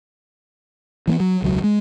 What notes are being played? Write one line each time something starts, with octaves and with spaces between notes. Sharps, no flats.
E3 A3 B3
F#3
E1 C#2 F#3
G#3